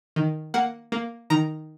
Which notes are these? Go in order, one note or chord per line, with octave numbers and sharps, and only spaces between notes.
D#3
A#3 F#5
A#3
D#3 A#5